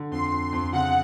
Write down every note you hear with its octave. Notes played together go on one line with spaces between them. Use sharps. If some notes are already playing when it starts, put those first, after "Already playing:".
Already playing: D3
F2 C6
F2
F2
C#3 F#5